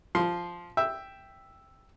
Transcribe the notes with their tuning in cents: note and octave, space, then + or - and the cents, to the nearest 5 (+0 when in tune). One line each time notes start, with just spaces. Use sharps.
F3 +0 C6 -5
E5 +0 G5 +0